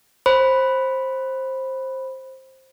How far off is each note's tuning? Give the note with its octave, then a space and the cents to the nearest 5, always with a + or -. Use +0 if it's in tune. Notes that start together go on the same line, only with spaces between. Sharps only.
C5 +15 B5 +0